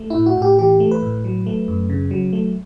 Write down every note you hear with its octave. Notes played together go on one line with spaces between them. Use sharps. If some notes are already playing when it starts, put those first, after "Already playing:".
Already playing: A3
A2 E4
F#4
A2 G4
E3 G4
A3
B4
A2
F#3
A3
F#2
C#3
F#3
A3